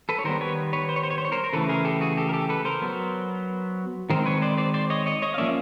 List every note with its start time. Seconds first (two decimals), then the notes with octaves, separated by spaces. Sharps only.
0.09 A4 B4
0.19 C#5
0.24 D#3 G3 B3 A#4 C5
0.41 B4 C#5
0.73 B4 C#5
0.89 C5
0.96 C#5
1.03 C5
1.10 C#5
1.18 C5
1.25 C#5
1.32 A#4 C5
1.44 A#4
1.53 C#3 E3 A3 A4 B4
1.69 G#4 A#4
1.85 G4 A4
2.01 F#4 G#4
2.17 G4 A4
2.29 A#4
2.33 G4 A4
2.49 A4 B4
2.65 A#4 C5
2.82 F#3 B3
4.10 D#3 G#3 C4 A#4 C5
4.26 B4 C#5
4.42 C5 D5
4.58 C5 D5
4.74 C5 D5
4.90 C#5 D#5
5.06 C#5 D#5
5.22 C#5 D#5
5.34 F5
5.38 F3 A#3 C#4 D5 E5